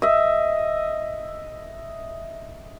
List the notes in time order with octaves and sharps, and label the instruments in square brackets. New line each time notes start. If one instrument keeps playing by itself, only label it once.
[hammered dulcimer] D#5 E5